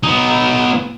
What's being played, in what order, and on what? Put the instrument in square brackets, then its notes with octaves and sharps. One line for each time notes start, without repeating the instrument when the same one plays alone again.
[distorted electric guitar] B3 D#4